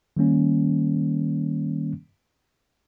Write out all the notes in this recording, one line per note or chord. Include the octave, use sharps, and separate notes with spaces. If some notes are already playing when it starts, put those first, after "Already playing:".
D#3 G3 A#3 C#4